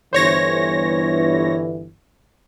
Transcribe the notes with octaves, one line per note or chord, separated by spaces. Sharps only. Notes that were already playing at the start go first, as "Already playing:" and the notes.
G1 E3 C5 C#5 A#6